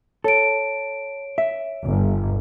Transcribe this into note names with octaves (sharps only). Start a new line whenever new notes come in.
A4 C#5 D7
E5
G1